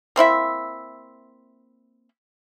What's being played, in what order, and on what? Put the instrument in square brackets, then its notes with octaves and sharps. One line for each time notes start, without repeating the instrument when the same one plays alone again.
[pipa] A#3 C4 E4 E5